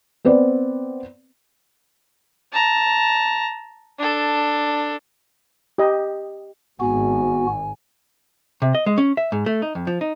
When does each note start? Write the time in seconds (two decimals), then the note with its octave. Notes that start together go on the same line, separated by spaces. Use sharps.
0.25 B3 C4 B4 D5
2.52 A5 A#5
3.99 D4 A4
5.78 G4 D#5
6.80 G#1 B3 F#4 G#5
8.62 C3
8.75 D#5
8.86 G#3
8.98 C#4
9.17 E5
9.32 G#2
9.46 A3
9.62 D#4
9.75 F2
9.87 F3
10.01 D#4